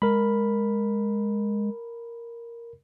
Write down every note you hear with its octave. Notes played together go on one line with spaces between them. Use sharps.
G#3 A#4 B5